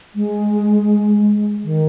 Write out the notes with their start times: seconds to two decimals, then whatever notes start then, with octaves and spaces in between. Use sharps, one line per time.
0.15 G#3
1.64 D#3